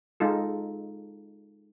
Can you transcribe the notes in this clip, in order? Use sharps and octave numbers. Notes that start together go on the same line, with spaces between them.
G#3 D#4 F4 A4